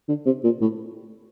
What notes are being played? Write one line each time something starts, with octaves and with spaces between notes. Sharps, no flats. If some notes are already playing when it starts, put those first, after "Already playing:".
D3
C3
A#2
A2